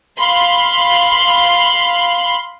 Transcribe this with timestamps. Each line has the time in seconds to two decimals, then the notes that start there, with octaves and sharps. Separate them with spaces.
0.18 F5 B5 C6